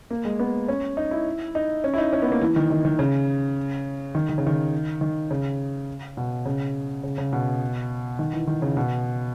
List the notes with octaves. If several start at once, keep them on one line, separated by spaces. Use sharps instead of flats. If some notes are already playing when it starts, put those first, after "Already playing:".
A#3
G#3
B3
C#4
D#4
E4
D#4
C#4
E4
D#4
C#4
B3
A#3
E3
D#3
D#3
D#3
C#3
D#3
D#3
C#3
D#3
D#3
C#3
B2
C#3
C#3
C#3
B2
D#3
E3
D#3
C#3
B2